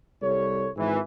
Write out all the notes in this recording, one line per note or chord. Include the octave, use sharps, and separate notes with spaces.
C2 G3 A4 C#5
G#1 E3